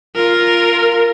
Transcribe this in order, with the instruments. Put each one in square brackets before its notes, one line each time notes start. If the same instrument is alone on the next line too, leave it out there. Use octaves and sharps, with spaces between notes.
[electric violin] F4 A#4